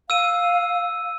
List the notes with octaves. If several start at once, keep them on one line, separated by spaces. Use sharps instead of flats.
F5 E6 D#7